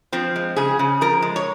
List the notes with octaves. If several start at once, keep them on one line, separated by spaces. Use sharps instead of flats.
F3 C4
G#3
C#3 G#4
C#3
F3 A#4
G#3
C#5